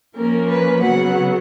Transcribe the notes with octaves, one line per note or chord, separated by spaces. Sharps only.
F3 A#3 C#4 A#4
B4
C#3 F#3 B3 F#5